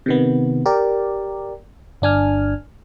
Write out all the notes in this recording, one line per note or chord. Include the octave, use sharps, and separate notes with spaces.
C3 D#3 B3
G4 A#4 D5
G1 D4 G#5 F6